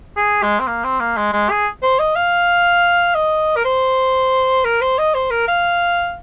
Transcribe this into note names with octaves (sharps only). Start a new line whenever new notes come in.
G#4
G#3
C4
A#3
C4
A#3
G#3
G#3
G#4
C5
D#5
F5
D#5
A#4
C5
A#4
C5
D#5
C5
A#4
F5